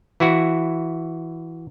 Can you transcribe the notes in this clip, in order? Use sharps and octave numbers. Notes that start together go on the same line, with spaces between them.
E3 E4 F#4